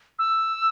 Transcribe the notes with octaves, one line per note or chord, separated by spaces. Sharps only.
E6